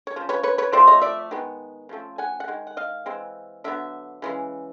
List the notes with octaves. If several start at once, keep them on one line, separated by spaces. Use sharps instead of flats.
C#5
C#3 F3
B4 C#5
B4 C#5
B4 C#5
F3 A3 C4 C5 D5
C#5 D#5
D5 E5
D#3 G#3 B3
C#3 F3 A3 C4
F#5 G#5
F#5
D#3 G#3
F#5
D#5 F5
E3 G#3 C4
D3 F#3 B3 E5
C#3 E3 G#3